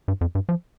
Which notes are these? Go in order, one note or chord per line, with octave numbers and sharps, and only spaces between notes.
G2
F2
G2
F3